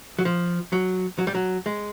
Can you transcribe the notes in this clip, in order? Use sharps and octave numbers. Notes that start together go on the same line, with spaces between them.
F#3
F3
F#3
F#3
G3
F#3
G#3